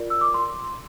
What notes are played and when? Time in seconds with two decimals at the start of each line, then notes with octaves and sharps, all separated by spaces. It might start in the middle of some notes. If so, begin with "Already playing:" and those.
Already playing: F4 A#4 D5
0.10 E6
0.21 D6
0.34 C6